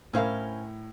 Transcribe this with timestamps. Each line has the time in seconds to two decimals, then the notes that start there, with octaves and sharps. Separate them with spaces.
0.13 A2 C#4 E4 A#4 C5 F5